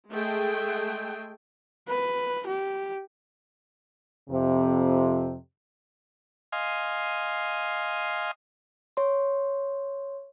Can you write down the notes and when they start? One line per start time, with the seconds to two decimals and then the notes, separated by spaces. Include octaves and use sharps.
0.11 G#3 A3 G#4 G5
1.88 B4
2.46 G4
4.29 F2 C3
6.52 D#5 F5 G#5 C6
8.97 C#5 C6